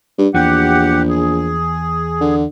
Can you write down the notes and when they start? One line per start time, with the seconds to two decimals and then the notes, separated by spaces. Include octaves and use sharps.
0.18 G2
0.34 A#1 E2 E3 G4 F#5
1.09 G#4
2.21 D3